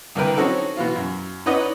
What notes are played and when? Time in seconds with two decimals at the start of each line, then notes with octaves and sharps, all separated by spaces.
0.15 C2 D3 A#4 B4 G5
0.37 C4 C#4 D#4 F#4 A4
0.77 B2 E3 F4
0.96 F#2
1.46 C#4 D#4 B4 D5 D#5 F#5